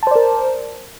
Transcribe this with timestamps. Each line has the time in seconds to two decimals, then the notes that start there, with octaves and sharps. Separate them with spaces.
0.03 A5
0.07 C5
0.11 D5
0.15 A#4